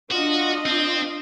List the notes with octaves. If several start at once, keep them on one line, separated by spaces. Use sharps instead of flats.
D4 F4 F#4 D#5
C4